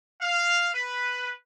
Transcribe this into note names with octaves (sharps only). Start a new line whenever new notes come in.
F5
B4